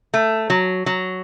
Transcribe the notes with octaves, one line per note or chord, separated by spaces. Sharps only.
A3
F#3
F#3